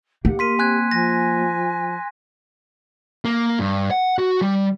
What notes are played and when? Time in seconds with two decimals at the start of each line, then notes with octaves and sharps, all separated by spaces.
0.25 A#3 G4 F#5
0.39 A#4 C6 B6 D#7
0.59 C4 G#5 F#6 G#6
0.91 F3 G#5 A#6
3.25 A#3
3.59 G2
3.91 F#5
4.18 F#4
4.42 G3